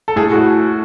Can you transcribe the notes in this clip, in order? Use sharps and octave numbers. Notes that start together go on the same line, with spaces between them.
A4
A2 G#4
F#4